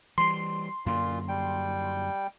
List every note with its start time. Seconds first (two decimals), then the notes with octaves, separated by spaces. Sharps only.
0.18 E3 G3 C6
0.86 F#2 A#2 D3 A#3 F4
1.28 G3 G5